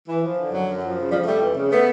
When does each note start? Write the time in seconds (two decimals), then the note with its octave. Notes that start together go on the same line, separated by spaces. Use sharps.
0.09 E3
0.23 F3
0.38 D3
0.52 F#2 F#3
0.67 F#2
0.83 F3
0.98 C#3
1.11 F2 F3 G3
1.26 F2 G3 A3
1.42 E3
1.56 C#3
1.71 A3 B3